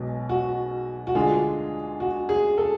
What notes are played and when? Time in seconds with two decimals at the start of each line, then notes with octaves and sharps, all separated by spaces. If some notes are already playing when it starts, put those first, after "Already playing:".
Already playing: B1 B2 G#3
0.29 F#4
1.07 F#4
1.15 D2 D3 G#3 D4 F4 G#4
2.00 F#4
2.29 G#4
2.58 A4